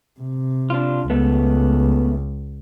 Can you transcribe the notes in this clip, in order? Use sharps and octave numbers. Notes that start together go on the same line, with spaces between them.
C3
D4 F4
C#2 A3 B3